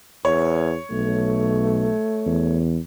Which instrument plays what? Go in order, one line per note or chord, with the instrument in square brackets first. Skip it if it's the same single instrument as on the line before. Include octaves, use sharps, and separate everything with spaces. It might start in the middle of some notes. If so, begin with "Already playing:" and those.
[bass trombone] E2 [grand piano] C#5
[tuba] B1 [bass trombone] A3
[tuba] E2